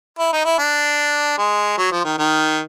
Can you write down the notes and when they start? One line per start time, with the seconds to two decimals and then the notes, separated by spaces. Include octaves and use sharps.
0.19 E4
0.33 D#4
0.45 E4
0.58 D4
1.38 G#3
1.78 F#3
1.92 F3
2.04 D#3
2.18 D#3